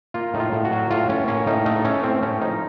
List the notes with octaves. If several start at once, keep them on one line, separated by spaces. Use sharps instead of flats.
A#3 F4
A2 D#4
F4
A2
F#4
F#3
A2 F4
A2 C#4
A#3 C#4
A2 D#4
A3 D#4
A3 C#4
A2 C4
A2 C#4
F3 D#4